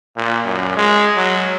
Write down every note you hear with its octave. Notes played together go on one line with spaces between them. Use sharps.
A#2
F#2
G#3
F#3